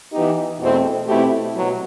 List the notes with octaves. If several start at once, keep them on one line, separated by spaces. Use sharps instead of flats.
E3 B3 D#4 G4
E2 B2 A3 C4 E4
B2 A3 C4 E4 G4
B2 F#3